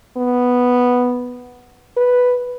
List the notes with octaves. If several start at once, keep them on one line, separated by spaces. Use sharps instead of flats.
B3
B4